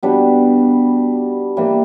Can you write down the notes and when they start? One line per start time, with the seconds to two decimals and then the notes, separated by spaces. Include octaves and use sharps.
0.03 B2 G3 B3 D4
1.57 E3 G3 A#3